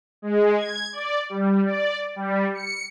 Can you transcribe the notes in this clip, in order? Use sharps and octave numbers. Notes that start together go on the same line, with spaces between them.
G#3
G#6
D5
G3
D5
G3
C#7